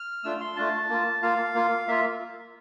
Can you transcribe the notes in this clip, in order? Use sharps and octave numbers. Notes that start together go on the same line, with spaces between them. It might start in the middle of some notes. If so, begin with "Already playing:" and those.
Already playing: F6
A3 D4 F4 E6
C6
A3 D4 F4 A5
A#3 F4
A#3 F4 F5
A#3 F4
A#3 F4 E5